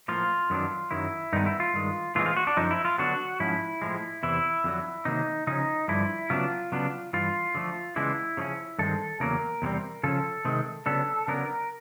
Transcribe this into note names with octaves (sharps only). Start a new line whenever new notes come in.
A2 F3 A#3 F4
F#2 D#3 F#3 B3 D4
F#2 D#3 F#3 E4
G2 D#3 G#3 B3 D#4
E4
F4
G2 D#3 G#3
A2 E3 G#3 C4 F4
F4
F#4
D4
F#2 D3 F3 D#4
E4
F4
D3 F#3 B3 D4 F#4
G#2 F3 C#4 E4
A2 F3 G#3
E2 C3 E3 E4
F2 D3 F#3
C3 D#3 F#3 A#3 D#4
C#3 F3 C#4 D#4
G2 D3 F3 E4
C#3 F#3 B3 D4 F4
C#3 F#3 B3 D4
G2 E3 F4
D3 F3 A3
C#3 E3 G#3 B3 D4 E4
C#3 F3 A3 C#4
G2 D#3 G#3 C4 A4
E2 C#3 F#3 A#3 C#4 A#4
E2 C3 E3 G3 C4
C#3 F3 C#4 A4
C3 D#3 G#3 C4
C#3 F#3 B3 D4 A4
C#3 F#3 B3 D4 A#4